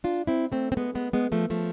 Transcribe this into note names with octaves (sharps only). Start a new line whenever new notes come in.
D4 F4
C4 E4
A3 C4
C4
G#3 B3
G#3 B3
G#3 B3
F3 A3
F3 A3